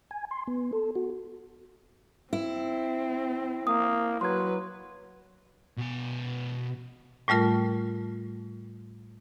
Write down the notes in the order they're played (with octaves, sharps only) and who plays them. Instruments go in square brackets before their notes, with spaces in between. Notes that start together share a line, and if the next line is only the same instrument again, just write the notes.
[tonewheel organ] G#5
C6
B3
A4
F#4
[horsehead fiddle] C4 [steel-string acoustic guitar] E4
[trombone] A#3 [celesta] D#6
[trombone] F#3 [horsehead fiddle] B4 [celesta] C6 G#6
[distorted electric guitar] B2 G#5
[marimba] A2 G3 A3 F4 A#4